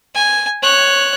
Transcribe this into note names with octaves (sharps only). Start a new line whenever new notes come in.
G#5
C#5 F#6